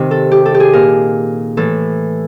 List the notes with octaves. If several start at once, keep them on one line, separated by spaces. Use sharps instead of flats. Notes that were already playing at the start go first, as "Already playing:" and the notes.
Already playing: C3 D#3
A4
G4
A4
G4
G#4
A#2 A#4
A2 E3 A4